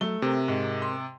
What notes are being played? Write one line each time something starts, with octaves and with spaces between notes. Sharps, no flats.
F#3 A3 G7
C3 C4 A#4
G#2
C6